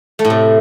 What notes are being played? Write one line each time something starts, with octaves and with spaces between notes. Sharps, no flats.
A3
A2
C3